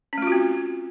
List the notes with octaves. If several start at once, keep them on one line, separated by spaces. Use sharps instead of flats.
A3 C4 C#4 F4 F#4